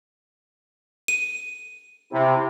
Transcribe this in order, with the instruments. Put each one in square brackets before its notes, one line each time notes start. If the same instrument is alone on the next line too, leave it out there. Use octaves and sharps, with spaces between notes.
[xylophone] D#7
[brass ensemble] C3 [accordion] C4 E4